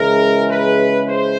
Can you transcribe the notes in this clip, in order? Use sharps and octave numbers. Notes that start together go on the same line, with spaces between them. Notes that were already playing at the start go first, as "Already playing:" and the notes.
Already playing: C#3 E3 G#3 A#4
B4
C5